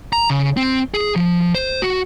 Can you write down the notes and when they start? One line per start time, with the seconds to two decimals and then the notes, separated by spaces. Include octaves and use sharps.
0.13 A#5
0.30 C#3
0.57 C4
0.94 G#4
1.16 F3
1.55 C5
1.82 F#4